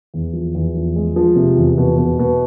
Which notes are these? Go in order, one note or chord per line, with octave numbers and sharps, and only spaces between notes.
E2
F3
E2
F3
G#3
F3
C3
E2
B2
B2
B2